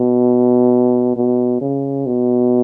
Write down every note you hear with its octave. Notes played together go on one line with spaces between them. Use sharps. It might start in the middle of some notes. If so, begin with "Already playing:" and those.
Already playing: B2
B2
C#3
B2